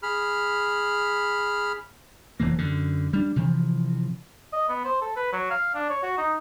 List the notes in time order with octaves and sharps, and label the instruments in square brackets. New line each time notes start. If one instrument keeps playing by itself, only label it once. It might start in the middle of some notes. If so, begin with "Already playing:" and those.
[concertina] G#4 B5 F6
[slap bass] F1 E3 A#3
F#2 D3
G3 D4
C3 E3 F3
[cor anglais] D#5
B3
C5
A4
B4
F#3
F5
D4
C#5
F#4
D#4